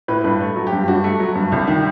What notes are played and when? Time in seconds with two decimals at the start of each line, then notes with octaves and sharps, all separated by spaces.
0.08 A2 B4
0.24 G2 B4
0.40 A3
0.56 F#3
0.67 G4
0.73 G2
0.88 G2 F#4
1.04 A3
1.20 F#3
1.35 G2
1.52 C2
1.67 D#3